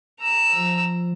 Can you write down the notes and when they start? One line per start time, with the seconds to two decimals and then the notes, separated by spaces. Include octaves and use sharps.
0.20 A#5 E6
0.52 F3